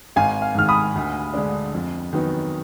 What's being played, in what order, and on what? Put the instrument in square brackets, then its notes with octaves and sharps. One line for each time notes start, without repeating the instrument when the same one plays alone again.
[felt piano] G#1 [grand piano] F5 G#5
[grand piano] F5
[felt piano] G#2 D#3 [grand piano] F6
[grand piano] B5 D#6
[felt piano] D2
D3 G#3 D4
F2
D#3 F#3 B3 D#4